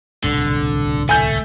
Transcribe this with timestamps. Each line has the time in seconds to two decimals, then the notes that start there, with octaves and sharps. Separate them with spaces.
0.24 D1 C2 B2 D3
1.09 A3 G#5 G6